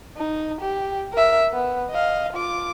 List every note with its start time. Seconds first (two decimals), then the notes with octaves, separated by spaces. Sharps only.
0.17 D#4
0.61 G4
1.13 A#4 E5
1.52 B3
1.91 D#5 F5
2.33 F4 D6